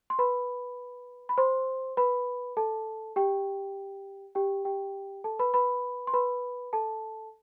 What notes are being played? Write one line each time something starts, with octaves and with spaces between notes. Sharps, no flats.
C6
B4 B5
B5
C5 C6
B4 B5
A4 A5
G4 G5
G4 G5
G4 G5
A4 A5
B4 B5
B4 B5
C6
B4 B5
A4 A5